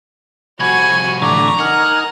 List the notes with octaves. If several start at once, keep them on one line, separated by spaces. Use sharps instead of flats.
C2 F2 F#4 G#5 B5 C#6 G#6
A2 D3 E3 A#5 C#6 D6
D#4 A#4 F#5 G#5 F6